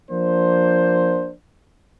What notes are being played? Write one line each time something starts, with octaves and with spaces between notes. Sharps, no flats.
F3 A#3 D4 C5